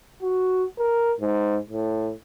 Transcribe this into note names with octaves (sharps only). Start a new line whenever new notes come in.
F#4
A#4
G#2
A2